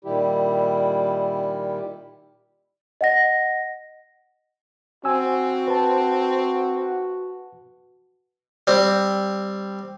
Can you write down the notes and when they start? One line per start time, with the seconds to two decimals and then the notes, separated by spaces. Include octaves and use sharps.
0.05 A#2 D#3 G3 E4 G4
3.01 D#5 F#5 A#6
5.05 C4 F#4 G#5 E6
5.68 B4 A5
8.67 G3 C4